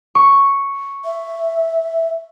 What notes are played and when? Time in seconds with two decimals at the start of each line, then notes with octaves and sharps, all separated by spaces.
0.15 C#6
1.05 E5